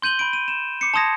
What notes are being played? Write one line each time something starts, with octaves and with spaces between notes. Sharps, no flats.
C6 G6 D#7 F#7 G7
B5 D7
D#7
E7
D6 C7 C#7
A5 A#5 C6 D#6 G#6 A#6